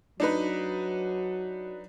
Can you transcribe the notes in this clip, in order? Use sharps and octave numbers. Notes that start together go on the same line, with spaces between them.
F#3 D4 D#4 B4